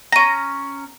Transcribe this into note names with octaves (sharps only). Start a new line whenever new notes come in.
C#4 A#5 A#6 D#7